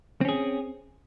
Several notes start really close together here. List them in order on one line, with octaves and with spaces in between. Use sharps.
C4 C#4 G#4